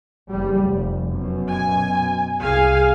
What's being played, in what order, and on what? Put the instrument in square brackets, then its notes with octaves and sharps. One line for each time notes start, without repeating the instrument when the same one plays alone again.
[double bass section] F#1 G3
F1
F#2 B2
[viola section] G#5
[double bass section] C2 [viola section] G#4 F5 G#5